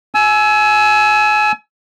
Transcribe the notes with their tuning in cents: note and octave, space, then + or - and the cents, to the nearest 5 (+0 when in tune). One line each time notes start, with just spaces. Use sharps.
G#5 +30 E6 +0